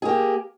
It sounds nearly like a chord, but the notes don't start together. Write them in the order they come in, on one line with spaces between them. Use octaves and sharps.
G#4 A#3 G4